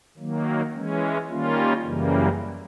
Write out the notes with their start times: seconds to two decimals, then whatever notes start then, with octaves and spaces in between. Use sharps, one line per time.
0.17 D#3 F#3 A#3
0.74 E3 G#3 C#4
1.29 D#3 G3 A#3 C#4 F4
1.84 F#2 C#3 E3 G3 A#3